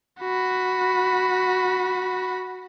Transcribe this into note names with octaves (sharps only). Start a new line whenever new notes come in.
F#4 B5